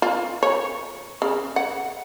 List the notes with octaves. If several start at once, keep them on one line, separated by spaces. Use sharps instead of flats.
F4
C#5
C#3
F#5